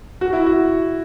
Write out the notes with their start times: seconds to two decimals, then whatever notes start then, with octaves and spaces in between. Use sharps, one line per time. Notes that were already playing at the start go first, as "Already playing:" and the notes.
0.21 F#4
0.33 E4
0.46 F#4